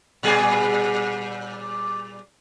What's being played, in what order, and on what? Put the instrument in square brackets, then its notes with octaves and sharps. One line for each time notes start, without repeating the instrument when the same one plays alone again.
[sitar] A#2 G3 G#4